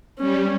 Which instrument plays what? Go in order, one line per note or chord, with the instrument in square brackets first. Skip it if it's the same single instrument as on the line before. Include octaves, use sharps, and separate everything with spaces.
[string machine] G3 [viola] C#4